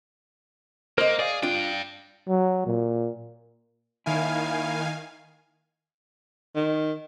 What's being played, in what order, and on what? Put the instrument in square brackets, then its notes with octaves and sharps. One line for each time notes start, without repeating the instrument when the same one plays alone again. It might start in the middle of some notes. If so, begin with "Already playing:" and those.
[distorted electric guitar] A#3 [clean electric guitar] A#4 [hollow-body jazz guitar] C5 D#5
[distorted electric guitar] G#4 [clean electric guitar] D5 F5
[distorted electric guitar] G2 G5 [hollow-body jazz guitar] D4 F4
[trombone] F#3
A#2
[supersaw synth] D#3 F5 G#5 [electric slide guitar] A#3 E4
[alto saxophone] D#3